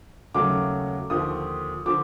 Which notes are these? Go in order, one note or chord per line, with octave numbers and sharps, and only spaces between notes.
D#2 C#3 F#3 A3 D6
D#2 D3 F3 D#6
D3 F3 D6